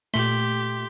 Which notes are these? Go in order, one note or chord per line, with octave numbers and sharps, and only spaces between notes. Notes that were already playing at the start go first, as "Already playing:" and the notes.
A#2 A3 G4 C6 B6 G7